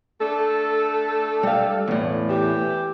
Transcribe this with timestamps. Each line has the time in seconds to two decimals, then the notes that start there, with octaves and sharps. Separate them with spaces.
0.21 A3 D4 A4
1.43 G3 F5
1.88 E2 A2
2.30 E3 G4